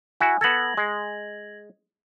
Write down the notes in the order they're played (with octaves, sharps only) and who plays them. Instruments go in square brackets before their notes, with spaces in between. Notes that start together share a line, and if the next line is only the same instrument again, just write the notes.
[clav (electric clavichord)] E4 F#4 [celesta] G#5
[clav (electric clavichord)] B3 A4 [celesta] G#6 A#6 F#7
[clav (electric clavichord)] G#3